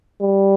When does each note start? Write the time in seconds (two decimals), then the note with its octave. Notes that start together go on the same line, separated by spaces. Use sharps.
0.22 G3